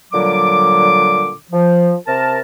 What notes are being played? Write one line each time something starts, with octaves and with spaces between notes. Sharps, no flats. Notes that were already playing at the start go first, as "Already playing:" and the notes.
A#2 D3 F#3 G3 D6
F3
C3 A#4 A5